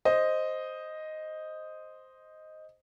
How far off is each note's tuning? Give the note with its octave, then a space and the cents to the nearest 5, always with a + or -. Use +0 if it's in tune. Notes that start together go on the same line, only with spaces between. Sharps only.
C5 +0 D#5 +0